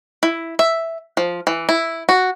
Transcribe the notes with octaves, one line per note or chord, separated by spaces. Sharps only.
E4
E5
F3
E3
E4
F#4